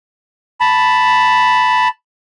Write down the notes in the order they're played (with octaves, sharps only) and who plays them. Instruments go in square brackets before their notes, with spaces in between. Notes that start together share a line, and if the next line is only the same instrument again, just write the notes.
[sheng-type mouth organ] A5 B5